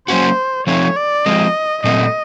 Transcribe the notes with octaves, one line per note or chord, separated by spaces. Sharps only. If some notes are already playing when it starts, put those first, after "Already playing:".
F#3 A#3 C#4 F#4 C5
F3 A3 C4 D#4 C#5
D5
F3 G#3 C4 D#5
A#2 F#3 A3 C4 D#5